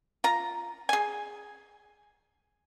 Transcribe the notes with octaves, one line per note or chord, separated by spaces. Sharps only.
F4 A#5
G#4 G#5